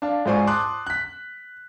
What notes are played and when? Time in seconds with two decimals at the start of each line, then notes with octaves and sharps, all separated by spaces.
0.02 D4 F5 A5
0.26 G#2 F4 C5 D5 G#5 C#6
0.47 A5 C6 D6 D#6 F#6
0.87 F#6 B6